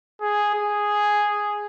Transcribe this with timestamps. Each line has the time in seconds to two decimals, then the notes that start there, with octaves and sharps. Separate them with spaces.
0.21 G#4
0.55 G#4